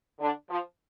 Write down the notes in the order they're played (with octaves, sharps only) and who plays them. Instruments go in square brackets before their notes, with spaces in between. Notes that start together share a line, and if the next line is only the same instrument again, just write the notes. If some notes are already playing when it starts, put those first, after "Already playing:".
[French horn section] D3 D4
F3 F4